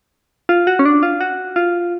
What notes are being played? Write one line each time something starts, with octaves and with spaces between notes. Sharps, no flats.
F4
F#4
C#4
D4
F4
F#4
F4